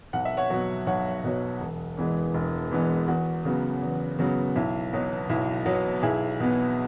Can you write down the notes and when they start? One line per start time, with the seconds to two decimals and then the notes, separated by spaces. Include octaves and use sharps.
0.13 B1 F#5
0.25 E5
0.37 C#5 F#5
0.50 B2 F#3
0.87 B1 C#5 F#5
1.24 B2 F#3
1.61 E1
1.97 E2 E3 G#3 B3
2.34 E1
2.71 E2 E3 G#3 B3
3.08 E2 F#4
3.45 C#3 F#3 B3
3.82 E2
4.19 C#3 F#3 B3
4.56 B1 E4
4.92 B2 F#3 B3
5.29 B1 E4
5.65 B2 F#3 B3
6.03 B1 E4 G#4
6.40 B2 B3